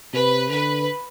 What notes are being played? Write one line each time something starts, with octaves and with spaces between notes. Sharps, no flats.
C3 B4
D3 B4